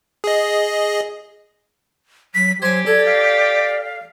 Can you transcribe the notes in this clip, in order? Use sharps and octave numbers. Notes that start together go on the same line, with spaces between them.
G#4 D#5
F#3 B6
F#3 G4 C5 G#5 G#6
A4 D5 G#6
F5